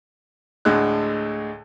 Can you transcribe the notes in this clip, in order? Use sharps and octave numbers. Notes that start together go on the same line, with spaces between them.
D2 A2 D3 G#3 F#6